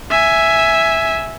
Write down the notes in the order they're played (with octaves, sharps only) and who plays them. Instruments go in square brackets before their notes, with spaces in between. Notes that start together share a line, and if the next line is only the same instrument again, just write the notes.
[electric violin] E5 G#5